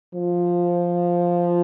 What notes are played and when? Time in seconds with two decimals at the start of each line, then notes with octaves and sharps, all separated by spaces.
0.15 F3